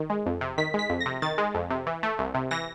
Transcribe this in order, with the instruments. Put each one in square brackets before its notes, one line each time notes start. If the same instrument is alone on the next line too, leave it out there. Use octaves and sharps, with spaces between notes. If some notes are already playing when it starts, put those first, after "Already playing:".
Already playing: [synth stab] D#3
G#3
F2
C3
D#3 B6
G#3
B6
F2
A#6
C3
D#3 A6
G#3
F2
C3
E3
A3
C2
C3
E3 A#6